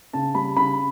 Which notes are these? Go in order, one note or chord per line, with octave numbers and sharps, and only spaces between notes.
C#3 A5
G3 B5
C#3 B5